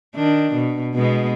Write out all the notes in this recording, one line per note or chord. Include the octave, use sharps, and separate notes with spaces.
D#3 D4
B2
B2 G#3 B3